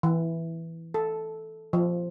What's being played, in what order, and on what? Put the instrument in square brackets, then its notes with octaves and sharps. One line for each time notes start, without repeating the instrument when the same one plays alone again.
[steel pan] E3
A4
F3